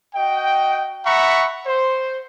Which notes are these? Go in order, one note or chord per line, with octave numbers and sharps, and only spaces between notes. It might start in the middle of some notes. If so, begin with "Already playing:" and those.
F#4 D#5 G5
E5 F#5 A#5 B5 C#6
C5